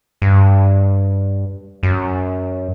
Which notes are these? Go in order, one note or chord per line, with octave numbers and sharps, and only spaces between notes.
G2
F#2